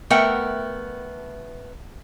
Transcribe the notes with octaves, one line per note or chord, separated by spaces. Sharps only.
A3 B3 A#4 E5 F#5 G5